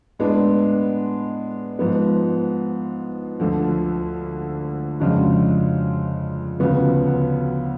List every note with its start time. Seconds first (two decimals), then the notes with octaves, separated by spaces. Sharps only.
0.19 A2 G#3 B3 D4
1.79 G#2 F3 B3
3.40 D2 D3 F3
5.00 F2 C#3 G#3 D4 F#4
6.60 D2 C#3 F3 B3 F#4